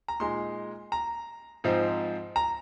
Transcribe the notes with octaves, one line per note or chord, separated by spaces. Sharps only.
A#5
A#2 G#3 D#4 C6
A#5
G#2 F3 C4 D#4
A#5